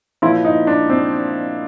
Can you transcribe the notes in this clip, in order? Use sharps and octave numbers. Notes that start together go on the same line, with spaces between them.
A#2 F3 E4
D#4
D4
C4